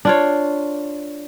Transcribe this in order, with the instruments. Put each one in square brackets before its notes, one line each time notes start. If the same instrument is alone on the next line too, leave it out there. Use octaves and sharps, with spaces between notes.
[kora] D4 F4 C#5